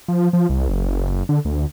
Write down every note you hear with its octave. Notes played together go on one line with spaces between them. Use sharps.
F3
F3
C2
F#1
D3
D2